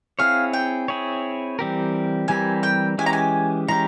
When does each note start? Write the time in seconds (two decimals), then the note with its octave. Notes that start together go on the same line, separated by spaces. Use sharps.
0.19 C4 E4 G#4 C#5 F5
0.53 G5
0.88 C4 E4 G#4 C#5
1.59 E3 G3 C4 G4 A#4
2.28 E3 G3 C4 G4 A#4 G#5
2.63 G5
2.98 E3 G#3 C#4 G4 G#5
3.06 A#5
3.13 G#5
3.68 E3 G#3 C#4 G4 A#5